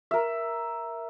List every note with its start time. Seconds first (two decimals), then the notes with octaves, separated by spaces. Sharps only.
0.11 A#4 E5